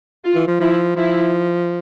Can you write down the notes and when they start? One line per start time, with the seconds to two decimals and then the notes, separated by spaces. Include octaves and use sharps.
0.24 F4
0.35 E3
0.47 F3
0.60 F3 E4
0.96 F3 E4